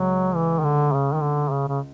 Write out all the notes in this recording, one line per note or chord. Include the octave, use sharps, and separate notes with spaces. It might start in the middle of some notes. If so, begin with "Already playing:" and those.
Already playing: C#2 F#3
E3
D#3
D3
C#3
D#3
D3
C#3
C#3